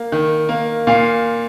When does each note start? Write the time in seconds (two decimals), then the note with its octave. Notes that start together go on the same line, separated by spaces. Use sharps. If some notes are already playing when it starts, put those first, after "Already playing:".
Already playing: A#3
0.12 D#3
0.49 A#3
0.87 A#2 F5